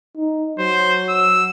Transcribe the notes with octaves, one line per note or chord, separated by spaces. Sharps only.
D#4
F#3 C5
E6